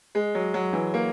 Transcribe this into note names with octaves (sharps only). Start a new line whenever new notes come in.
G#3
F#3
F#3
E3
A#3